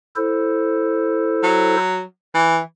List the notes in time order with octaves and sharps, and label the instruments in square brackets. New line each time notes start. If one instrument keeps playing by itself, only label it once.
[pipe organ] E4 A4 C5
[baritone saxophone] F#3
E3